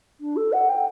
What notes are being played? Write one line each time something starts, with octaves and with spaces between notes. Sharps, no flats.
D4
A4
F#5
G5